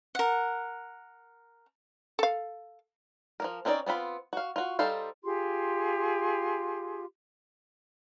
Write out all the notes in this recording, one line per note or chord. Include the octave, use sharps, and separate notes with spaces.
A#4 F#5
A4 F5
F3 A#3 A#4
C4 C#4 D#4 C5 D5
B3 C4 F4 B5
F#4 F5
F4 F#4
G3 D#4 A4 C5 F5
F4 G4 G#4 C6